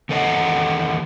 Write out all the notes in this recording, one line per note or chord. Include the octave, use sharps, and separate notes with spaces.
E2 D#3 A4 C#5 D#5 F#5